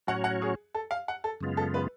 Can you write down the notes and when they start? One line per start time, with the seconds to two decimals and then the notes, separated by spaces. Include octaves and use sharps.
0.07 A2 F#3 C#4 F#4 C#5 F#5
0.24 F#5
0.42 G#4
0.74 A4
0.91 F5
1.08 F#5
1.24 A4
1.41 F#2 C#3 G#3 B3 F4
1.57 A4
1.74 B4